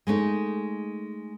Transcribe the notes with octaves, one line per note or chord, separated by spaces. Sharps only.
G#3 A3 C#4 D#4